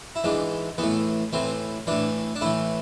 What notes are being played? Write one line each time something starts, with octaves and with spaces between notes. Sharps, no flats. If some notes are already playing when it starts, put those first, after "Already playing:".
E4
G#2 E3 D4
A2 E3 B3
A2 E3 C4
A2 E3 D4
D4
A2 E3 E4